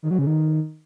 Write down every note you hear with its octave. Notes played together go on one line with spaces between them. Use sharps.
D#3
F#3
C#3
D#3